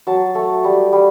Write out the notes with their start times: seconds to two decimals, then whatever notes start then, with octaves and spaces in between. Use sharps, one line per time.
0.07 F#3 A5
0.35 A3
0.64 G3
0.92 G3